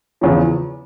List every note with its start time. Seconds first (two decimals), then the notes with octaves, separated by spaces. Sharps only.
0.21 E2 C#3 F3